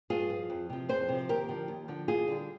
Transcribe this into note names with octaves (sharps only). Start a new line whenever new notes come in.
G2 F4 G#4
F3
F2
C3 F3
F2 G#4 C5
C3 F3
D#2 G4 A#4
D3 F3
D#2
D3 F3
D#2 F4 G#4
D3 G3